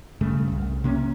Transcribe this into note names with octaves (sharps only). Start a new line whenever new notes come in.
G2 C#3 A3
D#1 C2
C3 A#3 C4 C#4